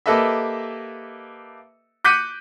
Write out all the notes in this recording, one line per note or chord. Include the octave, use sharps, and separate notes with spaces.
A#3 G4 A4 B4 D#5 E5
D6 F#6 G6 B6 C#7 D#7